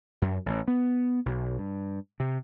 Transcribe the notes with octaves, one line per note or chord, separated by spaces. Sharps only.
F#2
A1
B3
B1
G2
C3